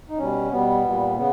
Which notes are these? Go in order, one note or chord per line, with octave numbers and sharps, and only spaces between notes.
D#4
B2 G3 C#4
B2 G3 B3
A#2 G3
C#3 B3